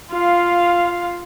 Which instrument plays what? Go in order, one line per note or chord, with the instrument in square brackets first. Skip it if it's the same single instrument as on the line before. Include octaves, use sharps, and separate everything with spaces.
[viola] F4 F5